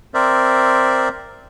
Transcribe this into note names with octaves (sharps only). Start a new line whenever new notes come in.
C4 A#4 C5 D5 E5